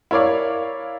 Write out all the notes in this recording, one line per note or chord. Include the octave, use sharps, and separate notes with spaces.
E4 A#4 C#5 D5 F5